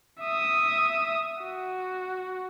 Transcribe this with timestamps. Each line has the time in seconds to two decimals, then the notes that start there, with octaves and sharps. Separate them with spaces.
0.22 E5 D#6
1.42 F#4